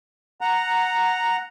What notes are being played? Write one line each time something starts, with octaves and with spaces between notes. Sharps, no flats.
F#5 A#5